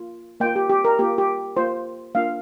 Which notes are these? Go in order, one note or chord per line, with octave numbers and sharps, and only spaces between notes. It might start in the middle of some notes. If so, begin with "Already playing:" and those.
Already playing: A#3 F4
A#3 F4 G5
G4
G4
A#4
A#3 F4 G4
G4
A#3 F4 C5
A#3 D4 F4 F5